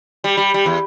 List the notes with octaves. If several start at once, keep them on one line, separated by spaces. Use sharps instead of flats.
G3
G3
G3
E2